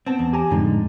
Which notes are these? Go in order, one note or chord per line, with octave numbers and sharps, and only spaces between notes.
B3 C4 A5
E2
G4 G#5 A#5
F2 A2 D3 G#3 D#4